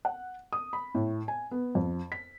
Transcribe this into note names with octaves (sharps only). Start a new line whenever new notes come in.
F#5
D#6
B5
A2
G#5
B3
F2
B6